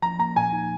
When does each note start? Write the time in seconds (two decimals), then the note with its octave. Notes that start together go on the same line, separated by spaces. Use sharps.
0.02 F3 A#5
0.19 A#3 A#5
0.36 A#2 G#5
0.53 D#4